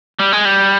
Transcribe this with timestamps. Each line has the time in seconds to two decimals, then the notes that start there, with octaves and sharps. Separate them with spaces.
0.19 G3
0.33 G#3
0.45 G3